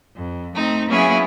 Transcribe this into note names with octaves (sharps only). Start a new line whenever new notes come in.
F2
A3 C4 D#4
F#3 A#3 B3 C#4 E4 G#4